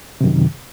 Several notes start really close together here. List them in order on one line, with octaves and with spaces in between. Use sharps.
C3 F#2 D#3